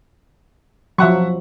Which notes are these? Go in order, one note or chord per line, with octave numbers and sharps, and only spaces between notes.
F3 F#3 E5 F#5 C#6